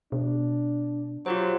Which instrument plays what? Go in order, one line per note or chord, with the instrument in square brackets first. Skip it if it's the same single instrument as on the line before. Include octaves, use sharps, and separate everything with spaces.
[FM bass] B2 [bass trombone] D4
[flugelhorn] F#3 [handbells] F4 G4 C5